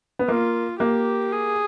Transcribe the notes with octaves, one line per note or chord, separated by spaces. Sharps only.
B3
A#3 F4
A#3 G4
G#4